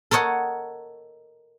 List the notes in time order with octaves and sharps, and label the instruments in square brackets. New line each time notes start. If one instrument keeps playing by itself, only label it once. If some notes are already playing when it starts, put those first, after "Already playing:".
[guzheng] A4 A#4 C#5 D#5 F#5